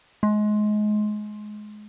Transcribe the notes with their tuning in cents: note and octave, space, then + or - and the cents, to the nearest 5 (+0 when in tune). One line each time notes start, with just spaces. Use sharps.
G#3 +25